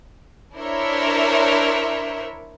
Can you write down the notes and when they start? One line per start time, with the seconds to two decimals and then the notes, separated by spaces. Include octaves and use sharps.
0.56 D4 E4 A#4 C5 C#5 E5